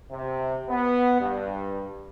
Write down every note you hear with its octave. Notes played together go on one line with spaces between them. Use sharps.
C3
B3
G2